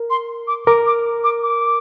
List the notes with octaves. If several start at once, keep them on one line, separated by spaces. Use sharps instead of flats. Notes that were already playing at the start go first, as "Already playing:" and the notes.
Already playing: A#4
C6
D6
A#4 D6
D6
D6
D6